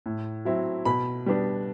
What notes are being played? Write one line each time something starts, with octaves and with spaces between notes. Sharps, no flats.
A2
F#3 C4 E4
B2 B5
G3 B3 D4